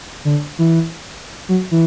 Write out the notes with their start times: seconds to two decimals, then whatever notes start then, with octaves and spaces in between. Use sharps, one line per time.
0.25 D3
0.59 E3
1.49 F#3
1.71 E3